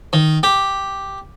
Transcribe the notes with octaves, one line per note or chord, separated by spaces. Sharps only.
D#3
G4